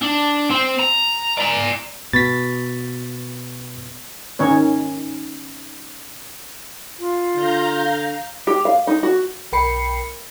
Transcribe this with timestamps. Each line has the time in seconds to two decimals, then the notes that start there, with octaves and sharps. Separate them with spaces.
0.02 D4
0.51 C4
0.79 A#5
1.37 D5 A#5
2.13 B2 A6 B6
4.39 D#3 C#4 D#4 C#5
6.99 F4
7.35 D3 F5 A#5 G6
8.47 G4
8.65 F5
8.87 D#4
9.03 F#4
9.53 B1 A#4 G5 B5 C7 C#7